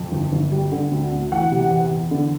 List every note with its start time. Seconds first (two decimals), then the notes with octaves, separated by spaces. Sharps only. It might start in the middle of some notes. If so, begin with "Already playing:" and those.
Already playing: F2
0.12 G1
0.32 G1
0.52 G3
0.72 D3
0.91 D2
1.12 D2
1.32 E3 F#5
1.51 C3
1.71 E2
1.91 E2
2.11 D3